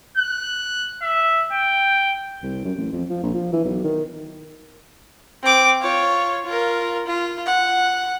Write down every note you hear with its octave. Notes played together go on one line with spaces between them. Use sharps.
F#6
E5
G5
C2
F#2
A1
F2
F3
A#1
F3
E3
B1
D#3
C4 D6
F4 C#5
F4 A#4
F4
F#5